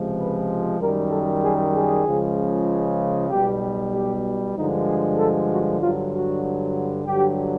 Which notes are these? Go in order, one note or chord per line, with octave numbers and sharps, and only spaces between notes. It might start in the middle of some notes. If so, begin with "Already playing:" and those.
Already playing: C#2 C3 F3 G#3
B4
F#2 D#3 G3 A#4
A4
G#4
G#4
C#2 C#3 F3 G#3
B1 B2 G3 G4
G4
G2 D3 F3 G#3 D#4
G#4
A4
F#4
G2 D3 F#3 F4
F#4
G2 D3 F#3 G4